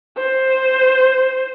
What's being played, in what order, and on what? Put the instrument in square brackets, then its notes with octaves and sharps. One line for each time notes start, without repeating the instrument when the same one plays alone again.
[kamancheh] C5